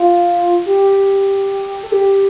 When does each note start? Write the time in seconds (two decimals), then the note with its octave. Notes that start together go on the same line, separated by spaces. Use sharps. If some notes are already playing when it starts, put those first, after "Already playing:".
Already playing: F4
0.66 G4
1.83 A4
1.92 G4